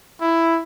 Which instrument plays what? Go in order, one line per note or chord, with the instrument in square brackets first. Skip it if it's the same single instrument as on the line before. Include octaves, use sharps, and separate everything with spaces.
[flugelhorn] E4